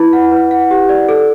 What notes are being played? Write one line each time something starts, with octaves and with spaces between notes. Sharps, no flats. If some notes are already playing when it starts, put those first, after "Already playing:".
Already playing: E4 B4 B5
F#5
B4
F#5
G4
D5
A4